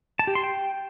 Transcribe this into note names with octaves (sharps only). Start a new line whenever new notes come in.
A5
G4
C6
G5